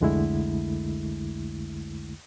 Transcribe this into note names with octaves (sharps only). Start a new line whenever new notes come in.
C2 F2 D3 G#3 A3 E4